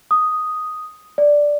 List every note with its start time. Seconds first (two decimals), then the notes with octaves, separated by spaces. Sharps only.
0.11 D#6
1.18 D5